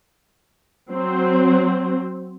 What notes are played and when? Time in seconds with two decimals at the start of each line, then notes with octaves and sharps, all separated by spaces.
0.91 F#3 C4